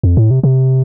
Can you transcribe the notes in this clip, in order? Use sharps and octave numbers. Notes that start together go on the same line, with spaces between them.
F2
A2
C3
C3